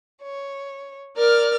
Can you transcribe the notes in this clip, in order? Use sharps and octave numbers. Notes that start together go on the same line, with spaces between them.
C#5
A#4 D5 F6